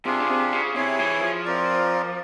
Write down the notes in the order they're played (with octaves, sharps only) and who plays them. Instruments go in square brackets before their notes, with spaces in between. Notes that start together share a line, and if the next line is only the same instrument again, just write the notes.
[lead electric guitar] C3 [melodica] D4 F4 G#4
[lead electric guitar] C#3
C3
C#3
[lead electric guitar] C3 [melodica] E4 G#4 C#5
[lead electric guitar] E3
F3
[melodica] C4 F4 A#4 D5